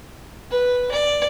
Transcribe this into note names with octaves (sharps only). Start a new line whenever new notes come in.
B4
D5